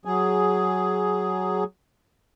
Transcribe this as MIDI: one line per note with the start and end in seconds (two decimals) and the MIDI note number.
0.05 1.64 54
0.05 1.64 68